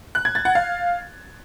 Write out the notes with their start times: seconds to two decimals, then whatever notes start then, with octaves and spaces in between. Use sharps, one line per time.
0.15 F#6
0.25 G#6
0.35 A6
0.45 F#5
0.55 F5